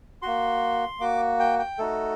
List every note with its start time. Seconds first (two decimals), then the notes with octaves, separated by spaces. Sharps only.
0.22 A#3 F#4 C6
1.00 A#3 F#4 D6
1.40 G5
1.59 G5
1.78 A3 D#4 F#4 A4